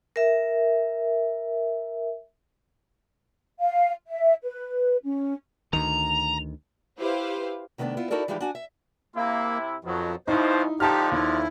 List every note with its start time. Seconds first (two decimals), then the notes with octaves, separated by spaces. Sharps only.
0.16 A#4 E5
3.60 F5
4.07 E5
4.43 B4
5.03 C#4
5.73 D2 D#3 A#5 F7
7.00 E4 G4 B4 C5 F5
7.78 C3 D#3 A3 B3 D4
7.97 B3 E4 F4
8.10 D#4 E4 F#4 A4 A#4 D5
8.28 E3 F3 G3 G#3 D#4 G4
8.40 D4 F#4 G#5
8.55 E5
9.16 C3 A#3 E4
9.85 F2 B2 D#3 F3 F#3
10.28 G2 B2 F3 D#4 E4 C5
10.80 D3 F3 D#4 G4 G5 A5 F6
11.11 D#2 E4